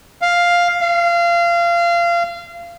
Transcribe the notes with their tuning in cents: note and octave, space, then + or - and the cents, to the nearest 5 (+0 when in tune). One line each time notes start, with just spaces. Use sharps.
F5 +5
F5 -25